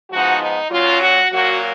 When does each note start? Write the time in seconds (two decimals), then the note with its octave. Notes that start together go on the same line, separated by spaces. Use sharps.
0.10 G#2 F3 B3 D#4 F#4
0.41 D#4
0.70 A#2 F#3 C#4 F4
1.01 F#4
1.31 A#2 F#3 A#3 F#4